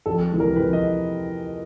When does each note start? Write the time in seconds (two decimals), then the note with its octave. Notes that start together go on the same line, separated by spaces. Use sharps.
0.06 F2 A4
0.31 C3 E3 G#3
0.40 A#4
0.56 F2 B4
0.73 D#5